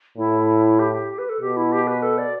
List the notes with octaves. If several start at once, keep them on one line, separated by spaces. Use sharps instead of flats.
A2 E4
G4
B4
A4
B2 G4
E4
G4
B4
A4
D5